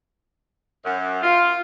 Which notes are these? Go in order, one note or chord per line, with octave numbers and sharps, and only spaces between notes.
F#2
F4